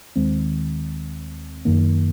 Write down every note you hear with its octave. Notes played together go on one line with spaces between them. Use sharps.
D#2 D#3 G#3 C4
F#2 D#3 A#3